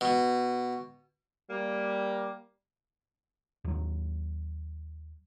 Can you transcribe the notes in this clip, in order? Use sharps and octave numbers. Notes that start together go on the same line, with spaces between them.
B2
G3 A#3
D#2 F#3